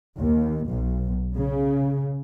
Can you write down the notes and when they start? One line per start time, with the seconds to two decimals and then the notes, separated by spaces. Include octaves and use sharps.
0.19 D#2
0.68 B1
1.36 C#3